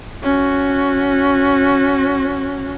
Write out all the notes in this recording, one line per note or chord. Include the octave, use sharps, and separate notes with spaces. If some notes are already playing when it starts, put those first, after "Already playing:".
C#4 F#4